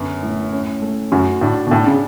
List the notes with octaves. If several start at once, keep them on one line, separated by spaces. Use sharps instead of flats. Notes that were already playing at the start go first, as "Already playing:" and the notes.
Already playing: F#2 D3 B3
A2
C#4
A3
F#2 F#4
A2 D4
B2
A2 D4
C#3